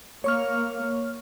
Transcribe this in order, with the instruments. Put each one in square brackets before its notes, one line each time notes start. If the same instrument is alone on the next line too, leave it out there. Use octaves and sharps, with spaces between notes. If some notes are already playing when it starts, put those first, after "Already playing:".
[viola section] A#3 [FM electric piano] C#5 C#6 F6